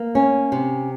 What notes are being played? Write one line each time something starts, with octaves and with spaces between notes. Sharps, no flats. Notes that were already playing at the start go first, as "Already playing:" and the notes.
Already playing: A#3
C#4
C3